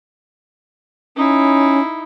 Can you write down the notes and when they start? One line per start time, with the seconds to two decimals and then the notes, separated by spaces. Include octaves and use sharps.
1.16 C#4 D#4 E4